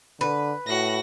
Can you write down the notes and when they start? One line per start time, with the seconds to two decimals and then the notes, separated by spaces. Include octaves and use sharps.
0.21 D3 B4
0.67 A2 F#4 A#6